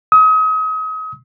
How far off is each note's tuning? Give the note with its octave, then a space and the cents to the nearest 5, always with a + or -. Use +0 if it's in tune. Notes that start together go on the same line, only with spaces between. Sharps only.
D#6 +35